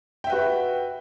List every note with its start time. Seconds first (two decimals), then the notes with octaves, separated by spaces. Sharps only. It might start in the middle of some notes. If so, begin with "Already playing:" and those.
0.24 G5
0.27 E5
0.30 B4
0.32 F#4